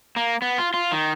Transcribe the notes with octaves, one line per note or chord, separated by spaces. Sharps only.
A#3
B3
F4
F4
D#3